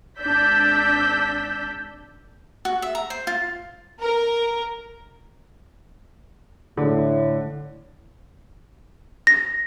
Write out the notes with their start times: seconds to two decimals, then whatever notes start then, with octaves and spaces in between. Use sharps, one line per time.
0.19 G#1 D4 D5 E6 G6 B6
2.65 F#4
2.82 E5
2.95 A#5
3.10 C5
3.27 F4
4.00 A#4
6.77 A2 D3
9.27 A#6